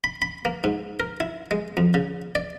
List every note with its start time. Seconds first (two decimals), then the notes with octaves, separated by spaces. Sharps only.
0.04 B5
0.22 B5
0.45 A#3
0.64 G#2
1.00 A#4
1.20 E4
1.51 G#3
1.77 F2
1.94 C#3
2.35 D5